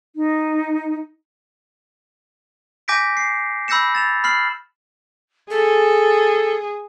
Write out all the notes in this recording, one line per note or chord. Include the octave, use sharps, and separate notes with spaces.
D#4
G#5 D6 G6 A#6 B6 D7
C7
B5 E6 G6 A#6 C#7 E7
A6 E7 F7
B5 F6 C7 F#7
G#4 A4